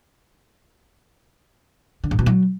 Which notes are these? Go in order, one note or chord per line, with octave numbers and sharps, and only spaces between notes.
D3
G#2
B2
F#3